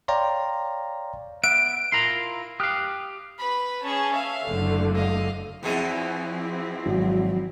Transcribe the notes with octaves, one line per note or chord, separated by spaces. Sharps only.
C#5 D5 F5 G5 A#5 C6
B3 E5 F#5 D7
E4 F4 A#4 A#5 C6
G4 F5 D#6 F6 F#6
B4 B5
C#4 G#4 C#5 A5
E5 F5
F#1 D3 A3
D#5 F5
E2 B2 F3 C4 E4 G#4
G#1 F#3